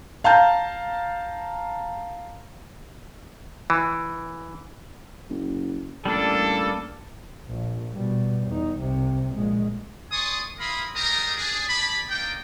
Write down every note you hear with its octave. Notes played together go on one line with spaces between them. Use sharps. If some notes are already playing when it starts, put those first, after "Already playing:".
F5 A5 A#5 G6
E3
F#1
A1 G3 A#3 D4 A4
A#1
B2 G3
E2 D#4
C2 C3
A#1 G#3
D5 G#5 C6 C#6 D#6
E4 A#4 F5 B5 C6 D#6
G3 G#3 G4 A#4 A#5 D#6
D4 G#4
G#4 D5 A5 B5
A#3 D4 D#4 G5